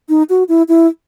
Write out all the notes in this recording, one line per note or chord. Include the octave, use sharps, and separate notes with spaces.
D#4
F#4
E4
E4